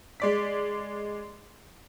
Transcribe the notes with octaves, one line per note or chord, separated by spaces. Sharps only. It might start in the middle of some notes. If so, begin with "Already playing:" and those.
G#3 D5 B6